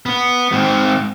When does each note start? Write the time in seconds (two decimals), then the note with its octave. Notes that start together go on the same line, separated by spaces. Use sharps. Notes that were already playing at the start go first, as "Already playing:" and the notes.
0.06 B3
0.52 G#2 C4